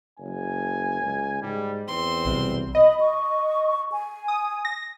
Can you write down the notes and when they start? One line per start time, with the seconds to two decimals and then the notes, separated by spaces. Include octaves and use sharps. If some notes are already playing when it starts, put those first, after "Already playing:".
0.19 F#1 G#5
1.01 C#2
1.42 G#2 G3
1.88 E2 C4 C6
2.26 B1 C3 G3
2.75 D#5 B5
3.00 C#6
3.92 G#5
4.28 D#6
4.65 A#6